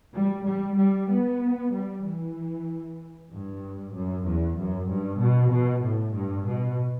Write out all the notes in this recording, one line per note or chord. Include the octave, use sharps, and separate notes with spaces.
G3
G3
G3
B3
G3
E3
G2
F#2
E2
F#2
G2
B2
B2
A2
G2
B2